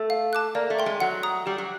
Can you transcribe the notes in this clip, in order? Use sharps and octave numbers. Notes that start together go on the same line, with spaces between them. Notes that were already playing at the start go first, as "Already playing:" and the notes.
Already playing: A3
F5
A5 D6 F#6
A#3 D5
A3
G5 C6
G#3
F#3 F#5
A#5 D#6
G3 G4
F#3